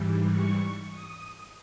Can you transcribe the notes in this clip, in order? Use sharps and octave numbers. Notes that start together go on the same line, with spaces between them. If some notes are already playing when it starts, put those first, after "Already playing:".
Already playing: G#2 E3 G3
C#6
D#6